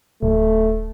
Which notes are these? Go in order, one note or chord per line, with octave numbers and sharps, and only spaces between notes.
D1 A3